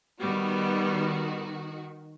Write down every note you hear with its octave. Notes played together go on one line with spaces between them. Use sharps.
D#3 G3 B3 F#4